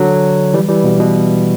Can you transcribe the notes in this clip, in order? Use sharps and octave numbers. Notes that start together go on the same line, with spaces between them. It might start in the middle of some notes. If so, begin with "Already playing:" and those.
Already playing: D3 F#3
E3 G3
E3 G3
B2
B2